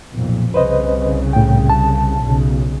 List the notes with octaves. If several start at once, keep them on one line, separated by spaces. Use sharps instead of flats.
B1 F2 A#2
C2 C#3 B4 C5 D#5
A2 G5
A5
B1 C#3